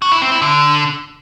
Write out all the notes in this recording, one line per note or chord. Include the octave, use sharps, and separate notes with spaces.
F#4
E4
C4
E4
D3